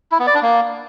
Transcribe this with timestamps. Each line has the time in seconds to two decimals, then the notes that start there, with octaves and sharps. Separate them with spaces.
0.12 E4
0.19 B3
0.27 D5
0.35 D4
0.42 A#3